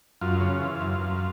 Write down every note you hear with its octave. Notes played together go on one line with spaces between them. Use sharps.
F#2 F4
C#3
E3
F#2
F#2